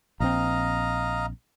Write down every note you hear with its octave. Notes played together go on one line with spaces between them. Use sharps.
A#1 E3 C4 D#5 F5 A#5